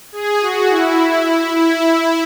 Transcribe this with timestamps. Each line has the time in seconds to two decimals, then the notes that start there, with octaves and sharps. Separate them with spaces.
0.12 G#4
0.41 F#4
0.70 E4
1.55 E4